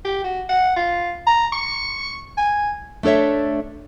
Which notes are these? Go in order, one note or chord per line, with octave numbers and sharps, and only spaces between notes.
G4
F#4
F#5
F4
A#5
C#6
G#5
A3 D4 A4 C#5 E5